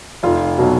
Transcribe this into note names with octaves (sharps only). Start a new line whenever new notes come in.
F1 F4
B2 F#3